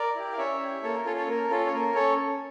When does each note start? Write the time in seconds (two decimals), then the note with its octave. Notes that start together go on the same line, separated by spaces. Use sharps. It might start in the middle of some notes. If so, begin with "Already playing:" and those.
Already playing: A#4 D5
0.16 E4 G4
0.32 F5
0.38 C#4 C#5 E5
0.60 E4 G4
0.83 A#3 A4 C#5
0.94 A#4
1.05 C#4 F4 A4 C#5
1.16 A4 C#5
1.28 A#3 A#4
1.50 C#4 F4 A4
1.66 C#5
1.73 A#3 A#4
1.95 C#4 A4 C#5